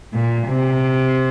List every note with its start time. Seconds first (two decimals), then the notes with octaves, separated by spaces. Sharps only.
0.14 A#2
0.47 C3